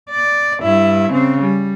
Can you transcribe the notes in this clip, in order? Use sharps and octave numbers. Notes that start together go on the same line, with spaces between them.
D5
G2 E4
C#3 C4
G3